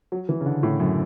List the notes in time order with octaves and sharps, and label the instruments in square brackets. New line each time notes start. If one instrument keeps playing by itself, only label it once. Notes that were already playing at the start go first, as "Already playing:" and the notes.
[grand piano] F#3
E3
C#3
D3
A2
F#2